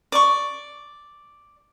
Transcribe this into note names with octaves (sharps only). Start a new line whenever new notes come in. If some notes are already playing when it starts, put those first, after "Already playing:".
D5 C#6